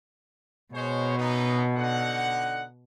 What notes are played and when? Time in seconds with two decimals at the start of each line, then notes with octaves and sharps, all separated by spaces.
0.73 B2 G#3 C5 C#5
1.16 F#2 B3 D#4
1.75 D3 D#4 F#5